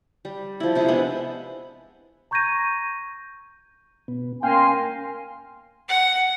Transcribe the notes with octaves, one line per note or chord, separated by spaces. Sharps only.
G3
F3 E4
C3 E4 G#4 A#5
G#3 B3 D4
A#5 C#6 G6 G#6 A#6 D#7
B2 B3
A#3 C#4 A#4 F5 G5 G#5 C6
F#5